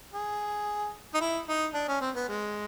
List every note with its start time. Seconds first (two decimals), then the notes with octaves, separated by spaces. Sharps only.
0.13 G#4
1.14 D#4
1.21 E4
1.48 D#4
1.74 D4
1.88 C#4
2.01 C4
2.15 B3
2.28 G#3